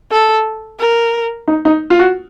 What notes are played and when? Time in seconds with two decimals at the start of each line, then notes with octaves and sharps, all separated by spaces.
0.12 A4
0.80 A#4
1.48 D#4
1.65 D#4
1.90 F4
1.99 F#4